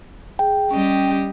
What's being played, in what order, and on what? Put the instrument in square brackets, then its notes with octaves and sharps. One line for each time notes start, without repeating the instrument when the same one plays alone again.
[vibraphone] G#4 [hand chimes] G5
[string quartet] G3 G4 D#5 [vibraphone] C#4